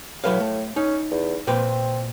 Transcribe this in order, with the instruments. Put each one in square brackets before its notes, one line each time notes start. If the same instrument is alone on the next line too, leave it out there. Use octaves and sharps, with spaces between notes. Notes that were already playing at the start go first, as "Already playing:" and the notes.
[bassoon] A2 [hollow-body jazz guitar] F#3 B4 F5
[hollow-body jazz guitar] A3
[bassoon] C#4 [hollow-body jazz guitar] D#4
[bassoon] E2
[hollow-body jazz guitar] A#2 B4 G5 [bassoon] C4